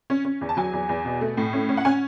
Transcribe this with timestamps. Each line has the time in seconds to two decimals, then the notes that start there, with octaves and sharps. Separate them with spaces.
0.10 C#4
0.25 C#4
0.41 E2
0.49 A5
0.57 F#3 G#5
0.73 E2
0.89 E2
1.05 B2
1.21 A3
1.37 A2
1.53 C#4
1.69 C#4
1.77 F#5
1.85 C#4 G#5